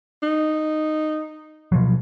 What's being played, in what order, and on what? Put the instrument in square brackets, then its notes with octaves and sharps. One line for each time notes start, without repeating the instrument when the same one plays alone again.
[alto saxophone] D#4
[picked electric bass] B2 F3 F#3